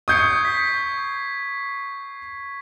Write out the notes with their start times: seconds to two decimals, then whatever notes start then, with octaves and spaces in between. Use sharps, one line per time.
0.08 C#6 D#6 G6 G#6 C7 C#7
0.45 B6